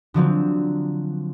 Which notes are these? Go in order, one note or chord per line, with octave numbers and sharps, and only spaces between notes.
D3 F3 F#3 C4